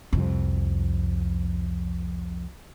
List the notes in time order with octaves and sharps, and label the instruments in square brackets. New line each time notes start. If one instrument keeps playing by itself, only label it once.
[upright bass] C2 F2